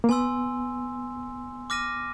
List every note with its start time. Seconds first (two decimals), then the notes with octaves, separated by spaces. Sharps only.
0.04 A#3
0.09 B3 G#5 C6 E6
1.70 D6 F6 A#6 D#7